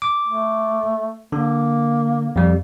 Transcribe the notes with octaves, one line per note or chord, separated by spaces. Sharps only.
D6
A3
D3 A#3
F2 G3